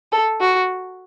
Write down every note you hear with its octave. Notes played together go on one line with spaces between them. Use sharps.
A4
F#4